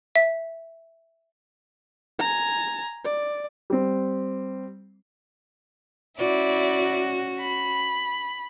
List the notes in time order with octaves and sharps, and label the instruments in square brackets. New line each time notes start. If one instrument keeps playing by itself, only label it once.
[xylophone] E5
[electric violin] G#5 A#5
D5
[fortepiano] G3 C4
[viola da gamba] C#4 F#4 [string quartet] E4 D5
[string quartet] B5